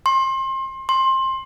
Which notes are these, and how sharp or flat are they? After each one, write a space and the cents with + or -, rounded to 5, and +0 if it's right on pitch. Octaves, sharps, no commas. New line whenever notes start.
C6 +30
C6 +20